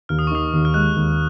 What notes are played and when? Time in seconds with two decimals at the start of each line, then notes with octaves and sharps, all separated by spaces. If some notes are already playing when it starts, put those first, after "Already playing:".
0.09 D#2 F6
0.19 D#6
0.27 C#6
0.31 D#3 D#6
0.53 D#2
0.65 F6
0.74 G#3 F#6
0.96 D#2